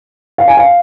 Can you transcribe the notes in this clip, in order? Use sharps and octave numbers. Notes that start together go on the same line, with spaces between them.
F5
G#5
F5